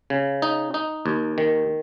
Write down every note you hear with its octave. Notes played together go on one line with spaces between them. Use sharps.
C#3
D#4
D#4
D#2
D#3